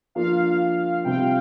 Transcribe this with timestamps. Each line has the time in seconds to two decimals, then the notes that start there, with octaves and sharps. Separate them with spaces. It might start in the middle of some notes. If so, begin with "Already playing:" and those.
0.15 F3 A#3 D4 F4 F5
1.04 C3 G3 C4 F4 G5